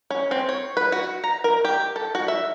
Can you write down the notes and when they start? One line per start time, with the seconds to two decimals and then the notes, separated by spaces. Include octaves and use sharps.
0.10 C#4
0.31 C4
0.49 C#5
0.77 B4
0.92 F#4
1.24 A#5
1.44 A#4
1.65 G4
1.96 A4
2.15 F#4
2.28 E5